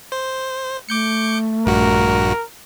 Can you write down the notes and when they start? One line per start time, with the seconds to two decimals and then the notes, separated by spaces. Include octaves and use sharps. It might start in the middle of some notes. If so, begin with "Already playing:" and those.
0.12 C5
0.89 A3 D6 G6 C#7
1.66 A#1 G2 F#4 A#4